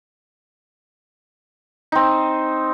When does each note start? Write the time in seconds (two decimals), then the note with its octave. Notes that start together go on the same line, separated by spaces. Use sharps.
1.92 C4 D#4